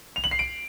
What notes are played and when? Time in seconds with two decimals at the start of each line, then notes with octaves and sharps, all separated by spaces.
0.16 F7
0.24 F#7
0.31 C7
0.39 D7